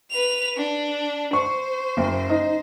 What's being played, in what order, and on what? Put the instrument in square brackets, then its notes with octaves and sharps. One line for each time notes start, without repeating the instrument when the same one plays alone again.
[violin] B4 F7
D4
[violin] C5 [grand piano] C#6
[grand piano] F#1
D#4